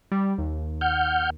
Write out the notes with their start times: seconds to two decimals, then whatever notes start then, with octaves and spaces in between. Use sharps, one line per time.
0.12 G3
0.38 D#2
0.81 F#5 F6 G6